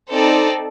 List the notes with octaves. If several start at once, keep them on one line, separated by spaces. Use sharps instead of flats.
C4 D#4 A4 D5